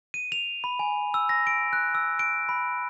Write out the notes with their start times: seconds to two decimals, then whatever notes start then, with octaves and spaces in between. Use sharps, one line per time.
0.14 D#7
0.32 F7
0.64 B5
0.79 G#5
1.14 E6
1.29 A#6
1.47 D7
1.73 F#6
1.95 E6
2.19 D7
2.49 B5